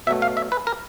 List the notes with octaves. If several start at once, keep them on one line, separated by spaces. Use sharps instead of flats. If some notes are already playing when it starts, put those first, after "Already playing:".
B2 F#3 A3 E5
F5
E5
B4
A#4